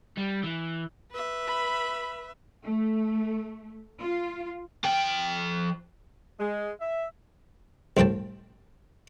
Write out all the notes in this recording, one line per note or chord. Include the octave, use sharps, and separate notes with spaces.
G3
E3
B4 E5
B5
A3
F4
F3 G5
G#3
E5
C2 A2 F3 G5 A5